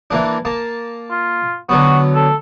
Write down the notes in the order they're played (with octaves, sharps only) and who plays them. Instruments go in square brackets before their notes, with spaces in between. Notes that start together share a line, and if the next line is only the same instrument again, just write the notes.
[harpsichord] E3 A#3 D4
A#3 A5
[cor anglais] F4
[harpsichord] D3 F#3 B3 [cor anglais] F#4
[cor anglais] A4